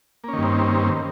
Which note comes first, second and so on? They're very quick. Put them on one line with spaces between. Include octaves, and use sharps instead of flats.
A#3 C#4 D#3 G2 C4